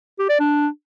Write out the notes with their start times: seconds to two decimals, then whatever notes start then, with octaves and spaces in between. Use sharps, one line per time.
0.19 G4
0.29 D5
0.40 D4